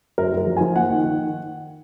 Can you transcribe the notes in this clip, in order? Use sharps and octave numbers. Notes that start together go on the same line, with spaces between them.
F#2 A#4
F#2 A#4
F3
F3 G#5
A#3 F#5
D#3
D#3